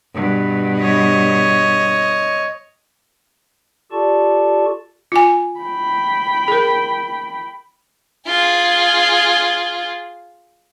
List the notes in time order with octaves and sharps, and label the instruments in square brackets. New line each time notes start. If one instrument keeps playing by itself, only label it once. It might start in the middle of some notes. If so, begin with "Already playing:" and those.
[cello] G2 B2
[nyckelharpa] C#5 D#5
[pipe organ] F4 G4 A4 D5 A5 C#6
[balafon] F4 G#5
[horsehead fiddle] G5 B5
[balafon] G#4 A#4
[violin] F4 G#4